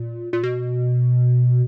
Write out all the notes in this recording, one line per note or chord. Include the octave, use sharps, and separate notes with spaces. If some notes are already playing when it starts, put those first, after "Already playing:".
Already playing: A#2
A#2
B2